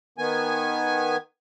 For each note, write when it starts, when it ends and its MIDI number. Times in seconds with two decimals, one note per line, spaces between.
0.18 1.17 51
0.18 1.17 59
0.18 1.17 80